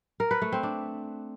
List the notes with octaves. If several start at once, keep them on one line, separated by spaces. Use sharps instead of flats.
A#4
B4
A3
C4
D4